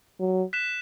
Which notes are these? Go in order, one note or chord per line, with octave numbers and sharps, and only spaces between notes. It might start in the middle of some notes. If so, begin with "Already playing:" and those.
F#3
F#6 B6 E7